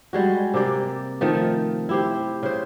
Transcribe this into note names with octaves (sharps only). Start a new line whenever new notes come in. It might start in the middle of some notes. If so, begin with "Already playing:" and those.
G3 G#3 F#4
C3 A#3 G4 D5
D#3 F3 A3
E4 G4 C5
C#3 C5